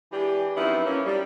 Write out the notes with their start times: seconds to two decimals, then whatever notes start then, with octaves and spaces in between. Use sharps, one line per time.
0.12 E3 G#3 D4 G4
0.57 F#2 F3 B3 C4 D#4 E4
0.85 E3 A#3 C#4
1.05 G3